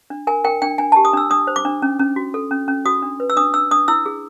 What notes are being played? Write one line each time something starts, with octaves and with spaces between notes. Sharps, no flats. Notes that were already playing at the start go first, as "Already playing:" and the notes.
D4
A#4 G#5
A#4 G5
D4 G5
D4 G#5
G4 A5
D#6
D4 E6
D4 D#6
C5
D6
D4
C#4
C#4
F#4
A4
C#4
C#4
F#4 D#6
D4
B4
E6
D4 D#6
D4 E6
D4 D#6
E4 E6
G#4